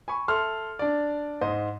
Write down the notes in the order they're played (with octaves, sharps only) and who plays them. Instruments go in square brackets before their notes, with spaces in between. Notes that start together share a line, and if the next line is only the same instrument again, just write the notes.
[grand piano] G#5 B5 C#6
A4 E5 C6 F6
D4 D5
G#2 C5 D#5